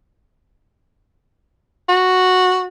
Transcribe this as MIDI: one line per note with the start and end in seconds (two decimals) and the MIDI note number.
1.89 2.66 66